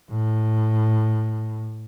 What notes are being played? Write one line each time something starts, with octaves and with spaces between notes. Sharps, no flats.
A2